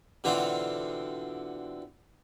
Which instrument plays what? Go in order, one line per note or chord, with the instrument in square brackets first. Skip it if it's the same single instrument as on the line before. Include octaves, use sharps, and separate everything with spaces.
[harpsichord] B2 D3 E3 C4 F4